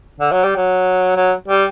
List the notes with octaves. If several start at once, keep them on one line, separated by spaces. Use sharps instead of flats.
D3
F#3
G3
F#3
F#3
G3